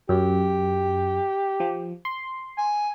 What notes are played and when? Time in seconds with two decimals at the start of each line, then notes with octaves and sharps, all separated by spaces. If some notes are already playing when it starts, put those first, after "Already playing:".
0.09 F#2 G4
1.60 F3
2.05 C6
2.58 G#5